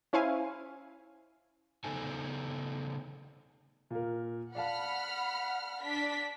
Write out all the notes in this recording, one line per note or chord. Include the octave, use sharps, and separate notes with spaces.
C#4 E4 C5 F5 G#5
C#3 B3 D#4 A4 C5 G#5
A#2 A#4
D5 F5 F#5 A5 B5 F6
D4 B6